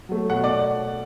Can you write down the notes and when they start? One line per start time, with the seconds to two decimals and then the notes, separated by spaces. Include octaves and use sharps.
0.09 F#3 A3
0.30 B2 F#5
0.44 D5